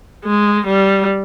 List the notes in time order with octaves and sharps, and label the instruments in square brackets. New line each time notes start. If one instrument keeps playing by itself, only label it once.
[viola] G#3
G3